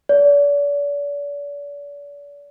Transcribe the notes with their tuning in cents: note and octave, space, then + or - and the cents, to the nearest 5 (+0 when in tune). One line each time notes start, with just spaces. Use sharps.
D5 -40